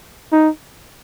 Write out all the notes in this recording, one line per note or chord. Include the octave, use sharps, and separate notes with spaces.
D#4